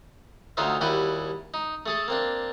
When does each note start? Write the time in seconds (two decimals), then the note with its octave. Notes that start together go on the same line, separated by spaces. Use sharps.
0.57 D2 F#3 D#4 F4 C5 E5
0.81 D#2 G3 E4 F#4 G5 G#5
1.54 D#4
1.86 A3 G#4 A4
2.08 A#3 C4 D4